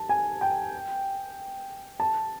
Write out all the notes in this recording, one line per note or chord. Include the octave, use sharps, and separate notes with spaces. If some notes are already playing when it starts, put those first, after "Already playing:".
Already playing: A5
G#5
G5
A5